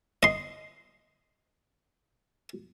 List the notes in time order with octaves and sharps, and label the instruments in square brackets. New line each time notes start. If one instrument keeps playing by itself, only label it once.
[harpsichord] D#5 C6